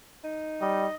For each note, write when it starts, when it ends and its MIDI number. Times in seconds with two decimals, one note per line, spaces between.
0.24 0.96 63
0.61 0.86 55
0.61 0.95 75